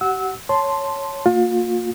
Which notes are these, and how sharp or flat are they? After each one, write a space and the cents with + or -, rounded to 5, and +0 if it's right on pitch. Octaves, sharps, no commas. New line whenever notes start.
G4 -40 F#5 +0 E6 -25
C#5 +0 A5 +0 C6 +0
A#3 -30 F4 +35